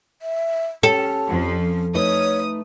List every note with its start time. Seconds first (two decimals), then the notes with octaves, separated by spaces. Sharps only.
0.22 E5
0.83 C#4 G4 A4 C#5
1.29 F2 F3
1.95 A3 D#4 B4 C#5 D#6